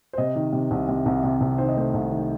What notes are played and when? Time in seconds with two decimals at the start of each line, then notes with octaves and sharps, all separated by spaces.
0.13 C5
0.18 C3 D#5
0.36 D#3
0.52 C3
0.71 C2
0.88 C3
1.06 C2
1.24 C3
1.41 C2
1.58 D#3 C5
1.68 D#5
1.77 A3 C5
1.94 C2
2.12 D#3